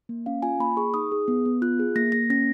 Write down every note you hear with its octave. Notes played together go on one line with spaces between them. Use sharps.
A#3
C#4 F5
F4 G#5
A#3 B5
G#4 C#6
D#4 D#6
G#4
B3
B3
F4 F#6
G#4
A#3 A#6
A#3 A#6
C#4 A#6